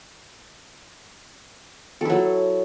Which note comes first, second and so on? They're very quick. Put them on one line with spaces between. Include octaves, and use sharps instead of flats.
A4 E4 F#3